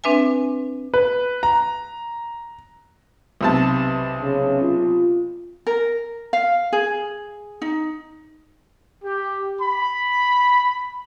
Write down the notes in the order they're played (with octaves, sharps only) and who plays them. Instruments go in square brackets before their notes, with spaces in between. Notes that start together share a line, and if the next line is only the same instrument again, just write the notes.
[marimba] C4 D4 B4 E5 G#5
[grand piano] B4
A#5
[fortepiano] B1 C3 A5
[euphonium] C#3
F4
[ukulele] A#4
F5
G#4
D#4
[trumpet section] G4
B5